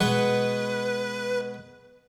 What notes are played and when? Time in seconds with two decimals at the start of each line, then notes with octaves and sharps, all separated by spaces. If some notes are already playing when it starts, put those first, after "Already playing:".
0.01 B2 G#3 B4 F#5